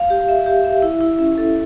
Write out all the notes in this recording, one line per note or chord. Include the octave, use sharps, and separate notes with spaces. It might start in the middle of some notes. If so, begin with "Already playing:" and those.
Already playing: F5
G4
E5
G4
E5
E4
E4
C#4
A4